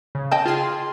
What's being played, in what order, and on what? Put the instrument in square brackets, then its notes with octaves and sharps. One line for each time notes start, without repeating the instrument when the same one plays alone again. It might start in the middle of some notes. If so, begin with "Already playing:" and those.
[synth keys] C#3
[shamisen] D#5 G5 A5
[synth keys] F4 G#4 C6